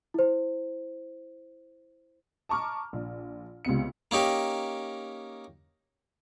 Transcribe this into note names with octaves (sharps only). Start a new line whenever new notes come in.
E4 C5
A5 A#5 C#6 D6 F6
A#1
C#2 C3 B3 C#7
A#3 C#4 D#4 G4